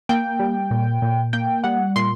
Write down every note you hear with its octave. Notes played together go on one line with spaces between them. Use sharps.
A#3 G5
G3
A#2
A#2
A#3 G5
G3 F#5
A#2 C6